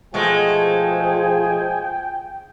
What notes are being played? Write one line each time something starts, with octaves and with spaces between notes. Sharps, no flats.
B2 F3 G#3 A3 G#4 G5 G#5